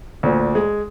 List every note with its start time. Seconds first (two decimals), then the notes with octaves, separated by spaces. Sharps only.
0.23 D2 A#2
0.55 G#3